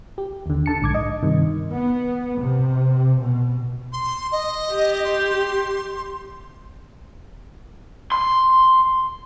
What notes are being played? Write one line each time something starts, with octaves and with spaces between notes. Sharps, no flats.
G4
D#2 D3
D3 A5 C#7
A#1 G#2 D6 G#6
D#5
G2 C3 D#3
B3
C3
B2
C6
D#5
G4
C6
C6